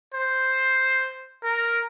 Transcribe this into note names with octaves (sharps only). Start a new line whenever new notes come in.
C5
A#4